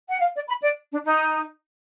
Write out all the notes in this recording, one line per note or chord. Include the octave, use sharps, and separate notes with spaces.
F#5
F5
D5
B5
D5
D4
D#4